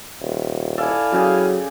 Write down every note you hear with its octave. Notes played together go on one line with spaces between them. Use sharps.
D#1
E4 A4 D5 F5 G#5 A5
C#3 F#3 G4 G#4